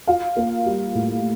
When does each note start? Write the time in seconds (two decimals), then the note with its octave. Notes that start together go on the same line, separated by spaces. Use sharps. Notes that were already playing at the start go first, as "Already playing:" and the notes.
0.07 F4 F5
0.37 A#3
0.66 G3
0.95 A2